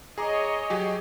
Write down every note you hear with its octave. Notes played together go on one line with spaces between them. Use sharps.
G#4 C#5 D#5 A#5 D6
F#3 G4 G#4